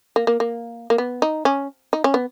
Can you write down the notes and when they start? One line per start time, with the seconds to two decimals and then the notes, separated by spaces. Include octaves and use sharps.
0.16 A#3
0.27 A#3
0.40 A#3
0.90 A#3
0.98 B3
1.22 D#4
1.45 C#4
1.93 D#4
2.04 C#4
2.14 B3